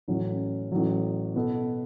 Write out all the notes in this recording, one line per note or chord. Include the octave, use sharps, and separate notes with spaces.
A1 A2 F#3 C#4
A1 A2 F#3
B2 B3 A4